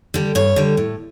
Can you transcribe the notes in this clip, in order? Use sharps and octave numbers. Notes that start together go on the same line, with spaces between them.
D3 G3
G2 C#5
D3 G3
A2